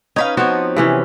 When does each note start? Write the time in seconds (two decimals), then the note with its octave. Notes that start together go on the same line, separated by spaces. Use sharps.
0.16 C#4 D#4 B4 F5
0.37 F3 B3 C4 F#4 C#5
0.77 C3 E3 C#4